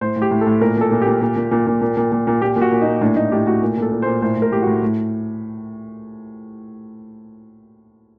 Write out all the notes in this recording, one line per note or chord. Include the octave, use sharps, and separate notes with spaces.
A2 C5
A2
G4
A2
A4
A2
A#2 A#4
A#2 A4
A#2
A#2 G4
A#2
A#2
A#2
A#2
A#2
A#2
A#2
A#2
A#2 G4
A#2
F#4
A#2
A#2 D#4
A2 D4
A2 D#4
A2 G4
A2 F#4
A#2
A#2 A4
A#2
A#2 C5
A2 C5
A2
A#4
A2 G4
A2 F#4
A2